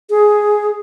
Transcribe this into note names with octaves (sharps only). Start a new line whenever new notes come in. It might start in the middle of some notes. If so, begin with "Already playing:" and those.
G#4